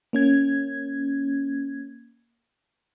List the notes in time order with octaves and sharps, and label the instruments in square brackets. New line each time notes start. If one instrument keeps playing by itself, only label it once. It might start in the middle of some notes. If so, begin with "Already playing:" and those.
[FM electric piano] A#3 C#4 G#6